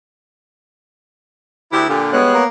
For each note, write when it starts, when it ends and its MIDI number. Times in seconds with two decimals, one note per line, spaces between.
1.72 1.86 38
1.72 1.87 64
1.72 1.86 67
1.89 2.10 46
1.89 2.19 50
1.89 2.10 67
2.13 2.36 55
2.13 2.36 56
2.13 2.43 59
2.13 2.43 73
2.13 2.43 90
2.34 2.47 58